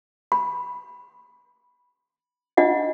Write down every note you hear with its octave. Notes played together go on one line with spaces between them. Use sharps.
B5
D4 F4 D#5 F#5